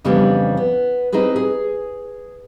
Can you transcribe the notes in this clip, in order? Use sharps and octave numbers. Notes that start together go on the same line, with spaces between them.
F2 C#3 E3 G3 B3 D4
B3
C4 D#4 E4 G#4 B4
G#4